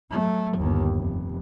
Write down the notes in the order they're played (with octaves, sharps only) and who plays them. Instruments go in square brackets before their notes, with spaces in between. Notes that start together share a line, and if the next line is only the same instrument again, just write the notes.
[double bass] F#3 A3
G1 D#2
F1